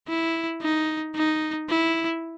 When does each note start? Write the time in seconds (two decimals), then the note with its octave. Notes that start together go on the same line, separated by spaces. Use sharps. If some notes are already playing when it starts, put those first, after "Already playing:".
0.08 E4
0.61 D#4
1.15 D#4
1.69 E4